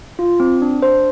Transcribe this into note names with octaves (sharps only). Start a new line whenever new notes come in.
F4
C4
D4
C5